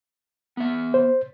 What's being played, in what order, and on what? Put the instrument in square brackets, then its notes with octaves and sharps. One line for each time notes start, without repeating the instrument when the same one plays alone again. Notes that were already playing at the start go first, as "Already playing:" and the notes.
[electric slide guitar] B3 E5
[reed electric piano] C5